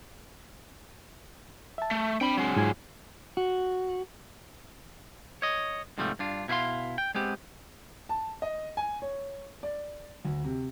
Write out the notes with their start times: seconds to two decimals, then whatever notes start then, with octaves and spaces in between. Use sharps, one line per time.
1.78 E5 A5
1.91 A3
2.21 C4 D4 G5 B5
2.37 F#3 G#3
2.56 G#2 F4 G#5
3.37 F#4
5.42 C#5 D#5
5.98 G#2 C3 F3 G3 A3
6.19 G2 D4 F4
6.48 B2 E4 B4 F5 C6
6.98 G5
7.15 G#3 B3 C4 G4
8.09 A5
8.42 D#5
8.77 G#5
9.02 C#5
9.63 D5
10.25 D2
10.44 C3